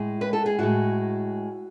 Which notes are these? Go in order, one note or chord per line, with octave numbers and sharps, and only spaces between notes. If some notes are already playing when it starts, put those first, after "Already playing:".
Already playing: A2 G#3
B4
A4
G#4
A2 G#3 F#4